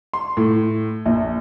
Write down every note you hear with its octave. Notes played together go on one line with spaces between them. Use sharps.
C6
A2
A#1